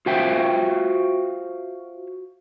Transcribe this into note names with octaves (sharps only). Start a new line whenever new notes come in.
F4 F#4 C5 E5 F5 G5